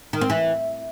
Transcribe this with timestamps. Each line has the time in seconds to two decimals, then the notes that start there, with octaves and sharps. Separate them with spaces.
0.13 D#3
0.21 C4
0.30 E3